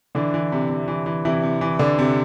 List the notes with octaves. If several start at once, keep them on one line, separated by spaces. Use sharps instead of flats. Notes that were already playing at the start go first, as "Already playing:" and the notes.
D3 E3 D4
E3
C3
C3
E3
E3
C3 E3 E4
C3
E3
D3 E3 D4
C3